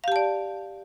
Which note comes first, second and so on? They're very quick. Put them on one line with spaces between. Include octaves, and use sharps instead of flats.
F5 G4 A5 D5